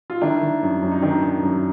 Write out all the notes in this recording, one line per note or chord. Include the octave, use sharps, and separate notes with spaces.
F4
D#3 D4 E4
D#3
F#2
F#2
D#4
D#3 D4
D#3
F#2